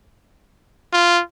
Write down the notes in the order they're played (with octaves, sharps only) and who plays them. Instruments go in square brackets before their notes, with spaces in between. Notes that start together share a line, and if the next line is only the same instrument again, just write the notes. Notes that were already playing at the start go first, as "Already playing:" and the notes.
[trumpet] F4